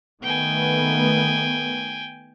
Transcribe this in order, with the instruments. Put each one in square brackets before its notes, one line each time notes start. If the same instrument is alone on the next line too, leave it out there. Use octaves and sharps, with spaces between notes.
[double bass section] D#3 A3 B3 [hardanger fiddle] G5 G#5